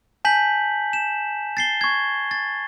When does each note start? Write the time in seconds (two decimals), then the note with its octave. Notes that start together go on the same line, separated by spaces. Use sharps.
0.25 G#5 A5 G6 B6 F#7
0.93 E7
1.57 A6 C7 G7
1.81 C#6 G#6
2.31 A6